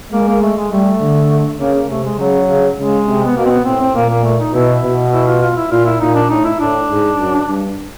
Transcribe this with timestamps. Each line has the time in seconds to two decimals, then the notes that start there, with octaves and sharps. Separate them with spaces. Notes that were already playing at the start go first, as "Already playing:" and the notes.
0.12 G#3 A#3
0.27 A#3
0.42 A3
0.57 G#3
0.71 G3 A3
1.00 D3
1.59 C#3 A#3
1.74 A#3
1.88 C3 A3
2.04 G#3
2.18 C#3 F#3
2.48 C#3
2.77 C#3 G#3
3.06 C3
3.25 B3
3.36 B2 A#3
3.45 C4
3.50 B3
3.65 A2 C4
3.81 C4
3.95 A#2 A#3
4.09 A#3
4.24 A3
4.39 D#4
4.53 B2 E4
4.83 B2
5.12 E4
5.27 F4
5.41 F4
5.56 E4
5.71 A#2 F4
5.86 E4
6.00 A#2 D#4
6.15 D4
6.30 A2 D#4
6.44 E4
6.60 A2 D4
6.88 G#2
7.18 F#2
7.48 G2